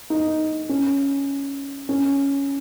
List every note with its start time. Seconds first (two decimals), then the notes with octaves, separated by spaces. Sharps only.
0.10 D#4
0.69 C#4
1.89 C#4